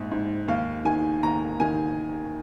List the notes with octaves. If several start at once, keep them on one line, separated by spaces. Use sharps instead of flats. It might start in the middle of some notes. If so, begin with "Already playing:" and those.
Already playing: A#1 G#2
G#2
D#2 F5
D#3 G#5
D#2 A#5
D#3 G#5